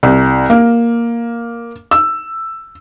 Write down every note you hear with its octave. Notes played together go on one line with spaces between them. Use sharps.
C2
A#3
E6